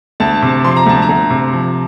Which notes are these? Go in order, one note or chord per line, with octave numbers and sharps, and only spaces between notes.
D2 A5
C3
F3 C6
A#5
D2 A5
A#5
D2
C3
F3